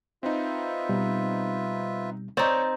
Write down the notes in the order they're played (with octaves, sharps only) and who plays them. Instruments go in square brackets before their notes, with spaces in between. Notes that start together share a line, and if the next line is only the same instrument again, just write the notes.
[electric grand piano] C4 D#4 [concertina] F4 B4 E5
[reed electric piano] B2 G3
[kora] C4 D#4 [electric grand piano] C#5 D5 A6